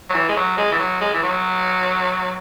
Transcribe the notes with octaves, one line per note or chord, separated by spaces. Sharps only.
F#3
E3
G#3
F#3
G#3
E3
F#3
G#3
E3
F#3